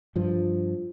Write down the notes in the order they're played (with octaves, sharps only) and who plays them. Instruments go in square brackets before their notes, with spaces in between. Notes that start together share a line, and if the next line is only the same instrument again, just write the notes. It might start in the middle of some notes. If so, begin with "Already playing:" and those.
[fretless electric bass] G2 F3